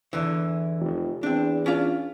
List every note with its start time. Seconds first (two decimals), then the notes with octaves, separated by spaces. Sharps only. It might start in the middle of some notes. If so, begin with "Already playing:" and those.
0.13 E2 D3 E3
0.80 F1
1.23 E2 C4 D4
1.66 C#4 D4 F4